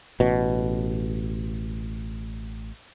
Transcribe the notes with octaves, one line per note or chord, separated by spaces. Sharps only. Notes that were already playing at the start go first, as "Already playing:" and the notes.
A1 B2